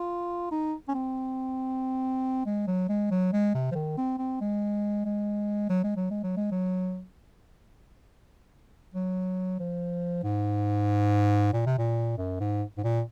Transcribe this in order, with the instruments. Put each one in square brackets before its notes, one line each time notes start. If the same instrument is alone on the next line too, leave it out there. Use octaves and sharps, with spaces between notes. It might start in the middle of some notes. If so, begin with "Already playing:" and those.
Already playing: [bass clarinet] F4
D#4
C#4
C4
G#3
F#3
G#3
F#3
G#3
C3
F3
D#3
C4
C4
G#3
G#3
F#3
G#3
F#3
G#3
F#3
G#3
F#3
F#3
F3
G#2
A#2
C3
A#2
F#2
G#2
G#2
A#2